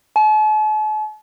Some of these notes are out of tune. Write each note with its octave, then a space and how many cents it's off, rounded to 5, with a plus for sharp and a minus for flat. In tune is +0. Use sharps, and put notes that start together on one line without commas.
A5 -45